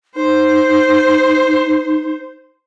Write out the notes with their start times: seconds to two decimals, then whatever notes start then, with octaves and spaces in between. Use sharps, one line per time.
0.16 D#4 C5